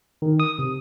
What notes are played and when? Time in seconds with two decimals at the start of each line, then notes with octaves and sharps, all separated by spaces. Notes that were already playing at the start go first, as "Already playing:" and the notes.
0.22 D#3
0.40 D#6
0.59 C3